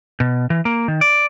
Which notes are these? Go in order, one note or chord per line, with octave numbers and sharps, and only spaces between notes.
B2
E3
A#3
D#3
D5